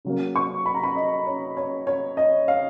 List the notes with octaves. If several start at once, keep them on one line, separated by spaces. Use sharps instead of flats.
C#3 F#3 A#3
C#6
B5
A#5
B5
D#5
C#5
C#5
C#5
D#5
F5